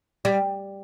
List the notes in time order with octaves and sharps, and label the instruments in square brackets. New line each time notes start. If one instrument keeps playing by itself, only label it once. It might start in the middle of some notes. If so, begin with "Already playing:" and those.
[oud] G3